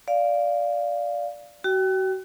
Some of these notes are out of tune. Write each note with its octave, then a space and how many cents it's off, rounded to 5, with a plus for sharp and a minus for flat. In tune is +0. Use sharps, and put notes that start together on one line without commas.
D5 -10 F5 +0
F#4 +35 G5 +0